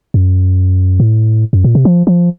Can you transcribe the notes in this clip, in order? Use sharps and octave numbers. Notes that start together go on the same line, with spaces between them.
F#2
A2
F#2
A#2
C3
F3
F3